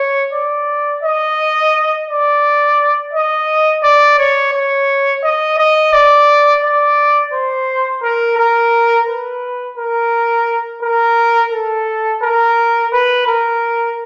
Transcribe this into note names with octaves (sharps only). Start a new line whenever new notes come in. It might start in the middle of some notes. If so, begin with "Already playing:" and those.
Already playing: C#5
D5
D#5
D5
D#5
D5
C#5
C#5
D#5
D#5
D5
D5
C5
A#4
A#4
B4
A#4
A#4
A4
A#4
B4
A#4